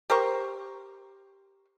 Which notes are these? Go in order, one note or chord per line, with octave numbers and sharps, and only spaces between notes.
G4 A#4 C5 C#6